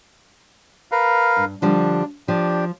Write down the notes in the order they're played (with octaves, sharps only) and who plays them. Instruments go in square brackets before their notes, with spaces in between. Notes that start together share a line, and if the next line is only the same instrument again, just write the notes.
[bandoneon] A#4 B4 F5
[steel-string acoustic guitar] G2
[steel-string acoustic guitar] D3 F3 G3 [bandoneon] D4
[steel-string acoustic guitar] F3 [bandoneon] D4 G4